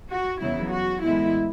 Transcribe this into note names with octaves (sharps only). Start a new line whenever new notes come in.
F#4
E2 C#3 F#3 B3 E4
F#4
A2 E3 G#3 B3 E4